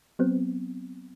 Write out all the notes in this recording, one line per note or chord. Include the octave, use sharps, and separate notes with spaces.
F#3 B3 C4